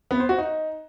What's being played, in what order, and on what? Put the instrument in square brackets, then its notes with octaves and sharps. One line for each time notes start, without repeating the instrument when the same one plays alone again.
[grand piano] B3
C5
F#4
D#4